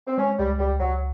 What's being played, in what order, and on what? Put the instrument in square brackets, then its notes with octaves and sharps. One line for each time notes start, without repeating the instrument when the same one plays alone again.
[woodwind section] C4
[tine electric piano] G#3 [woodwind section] C#4
[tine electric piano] C#2 [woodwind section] G3
[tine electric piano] C#2 [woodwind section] G3
[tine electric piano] C#2 [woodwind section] F#3